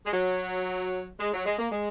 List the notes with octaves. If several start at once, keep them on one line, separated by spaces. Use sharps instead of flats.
G#3
F#3
G#3
F#3
G#3
A#3
G#3